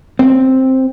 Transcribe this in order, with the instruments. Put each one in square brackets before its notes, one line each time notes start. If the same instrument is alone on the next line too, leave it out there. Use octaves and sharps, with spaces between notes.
[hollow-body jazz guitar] C4